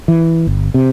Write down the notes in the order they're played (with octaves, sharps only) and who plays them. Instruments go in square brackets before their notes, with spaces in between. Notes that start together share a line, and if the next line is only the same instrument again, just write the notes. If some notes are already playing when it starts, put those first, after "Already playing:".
[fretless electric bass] E3
G1
C3